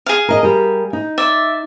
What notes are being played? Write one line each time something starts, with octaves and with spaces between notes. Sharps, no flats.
G#4 F5
A#4 D#5
G3 A#4
D#4
D5 E5